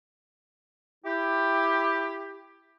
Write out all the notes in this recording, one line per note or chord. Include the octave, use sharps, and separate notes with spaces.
E4 G4